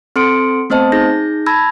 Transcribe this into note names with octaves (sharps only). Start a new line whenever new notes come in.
C4 A4 C6 C#7 D7
A3 B3 C4 C5 D#5 A5
D#4 G#4 G6 A#6
A5 B5 E6 G#6 A#6